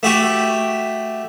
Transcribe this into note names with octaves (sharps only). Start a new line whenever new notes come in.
A3 F#4 G4